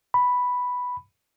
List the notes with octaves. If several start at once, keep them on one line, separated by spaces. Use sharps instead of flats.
B5